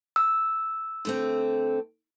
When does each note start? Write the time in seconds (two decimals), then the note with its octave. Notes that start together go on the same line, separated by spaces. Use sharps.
0.16 E6
1.05 D3 A3 C4